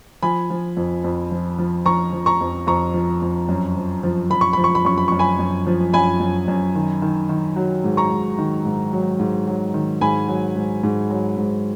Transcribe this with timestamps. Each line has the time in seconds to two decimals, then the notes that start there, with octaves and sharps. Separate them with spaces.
0.23 F3 G#5 B5
0.50 F3
0.77 F2
1.04 F2
1.31 F3
1.58 F3
1.85 F3 A#5 C#6
2.13 F3
2.26 A#5 C#6
2.41 F2
2.67 F2 A#5 C#6
2.94 F3
3.22 F2
3.49 F#2
3.76 F3
4.03 F3
4.30 F3 B5
4.41 C#6
4.53 F3 B5
4.64 C#6
4.75 B5
4.85 F#2 C#6
4.98 B5
5.08 F#2 C#6
5.19 G#5 B5
5.39 F#2
5.67 F3
5.94 F#2 G#5 B5
6.20 F#2
6.48 F#2
6.75 D#3
7.02 D#3
7.29 D#3
7.56 F#3
7.84 G#2
7.97 A#5 C#6
8.11 G#2
8.39 D#3
8.65 G#2
8.93 F#3
9.19 G#2
9.47 F#3
9.74 D#3
10.01 G#2 G#5 B5
10.28 F#3
10.55 G#2
10.83 G#2
11.10 F#3
11.38 G#2